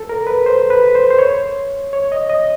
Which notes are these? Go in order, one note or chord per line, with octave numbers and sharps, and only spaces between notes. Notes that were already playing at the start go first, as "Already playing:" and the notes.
Already playing: A4
A#4
B4
C5
B4
C5
C5
C#5
C#5
D#5
D#5